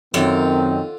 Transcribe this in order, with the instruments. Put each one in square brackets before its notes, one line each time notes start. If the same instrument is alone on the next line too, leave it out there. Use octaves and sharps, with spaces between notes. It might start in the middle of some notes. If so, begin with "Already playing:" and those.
[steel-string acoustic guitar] F#2 [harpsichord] D3 F4 [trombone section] D#3 [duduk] C4